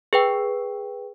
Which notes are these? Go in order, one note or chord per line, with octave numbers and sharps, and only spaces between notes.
G#4 B4 G5